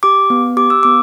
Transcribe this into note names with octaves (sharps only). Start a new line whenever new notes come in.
G4 D6
B3
G4 D6
E6
B3 D6